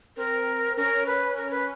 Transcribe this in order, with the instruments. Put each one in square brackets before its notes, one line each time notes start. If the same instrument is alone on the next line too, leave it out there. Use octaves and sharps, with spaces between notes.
[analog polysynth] C4 [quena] A#4
[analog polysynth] C#4 [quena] A#4
[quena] B4
A#4
B4